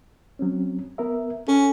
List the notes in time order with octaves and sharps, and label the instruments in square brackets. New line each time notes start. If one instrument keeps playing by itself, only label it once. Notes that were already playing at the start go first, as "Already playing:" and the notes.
[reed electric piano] F#3 C4 C#4
B3 A#4 E5
[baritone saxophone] C#4 [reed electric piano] A4